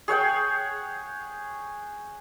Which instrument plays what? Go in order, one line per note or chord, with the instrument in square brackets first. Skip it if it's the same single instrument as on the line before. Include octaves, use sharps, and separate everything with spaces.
[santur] G#4 C#5 F#5 G5